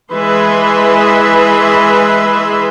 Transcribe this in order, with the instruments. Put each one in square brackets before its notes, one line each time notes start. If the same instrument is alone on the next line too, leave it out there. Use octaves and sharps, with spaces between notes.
[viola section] E3 G#3 G#4 B4 E5 C6